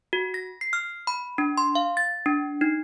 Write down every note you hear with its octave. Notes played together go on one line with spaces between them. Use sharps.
F#4
A#6
C7
F6
B5
D4
C6
F5
A6
D4
D#4